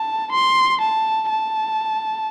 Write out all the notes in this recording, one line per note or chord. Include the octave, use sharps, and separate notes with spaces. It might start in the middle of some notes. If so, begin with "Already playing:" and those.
Already playing: A5
C6
A5
A5